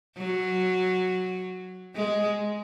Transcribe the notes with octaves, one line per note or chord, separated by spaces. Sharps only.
F#3
G#3